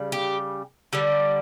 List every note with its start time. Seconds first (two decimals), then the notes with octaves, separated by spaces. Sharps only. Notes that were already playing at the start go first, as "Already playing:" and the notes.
Already playing: C#3 G3
0.12 G4
0.93 D3 G3 G4